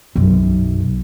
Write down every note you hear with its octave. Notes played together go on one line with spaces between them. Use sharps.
B1 F#2